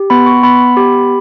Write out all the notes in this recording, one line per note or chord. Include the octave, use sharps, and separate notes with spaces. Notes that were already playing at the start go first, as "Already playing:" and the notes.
Already playing: G4
B3 B5
C#6
B3 B5
G4